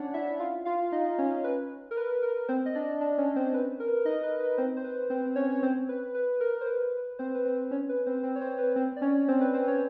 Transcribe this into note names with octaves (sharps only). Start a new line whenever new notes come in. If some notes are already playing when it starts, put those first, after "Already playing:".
Already playing: C#4 D4 C#5 D5 F#5
E4 E5
F4 F5
F4 F5
D#4 D#5
C#4 C#5
B4
A#4
B4
A#4
C4 C5
D#5
D4 D5
D4 D5
C#4 C#5
C4 C5
B4
A#4
B4
A#4
D#4 D#5
B4
B4
C4 C5
C5
B4
C4 C5
C#4 C#5
C#5
C4 C5
B4
B4
A#4
C5
B4
C4 C5
B4
C4 C5
C#4 C#5
B4
C4 C5
C4 C5
C#5
C4 C5
B4
C4 C5
D5
C#4 C#5
C4 C5
B4
C4 C5
C#4 C#5